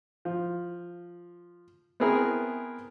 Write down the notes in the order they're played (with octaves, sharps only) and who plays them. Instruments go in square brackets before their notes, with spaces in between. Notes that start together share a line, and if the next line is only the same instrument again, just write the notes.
[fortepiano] F3
B3 C4 E4 G#4 A#4